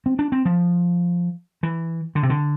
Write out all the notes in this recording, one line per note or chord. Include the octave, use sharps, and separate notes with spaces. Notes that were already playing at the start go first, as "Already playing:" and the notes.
C4
D4
C4
F3
E3
D3
C3
D3